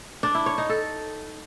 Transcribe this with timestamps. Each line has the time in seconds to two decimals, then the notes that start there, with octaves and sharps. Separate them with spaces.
0.23 D4
0.35 E4
0.46 C#5
0.58 D#4
0.69 A4